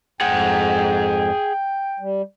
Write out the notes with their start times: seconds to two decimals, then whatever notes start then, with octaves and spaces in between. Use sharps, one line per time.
0.21 F2 G#2 G#4 F#5 G5
2.00 G3